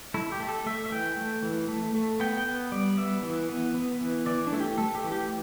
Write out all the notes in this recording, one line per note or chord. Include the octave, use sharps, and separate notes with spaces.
A3 E4
G4
A3
A4
A3 E5
E5
E3 G5
A3
E3
A3
A3
B3 G5
G5
B3
G3 D5
B3 E5
E3
B3
B3
E3
E3 D5
D4
A3 E4
G4
A3 A4
G4
E3
G4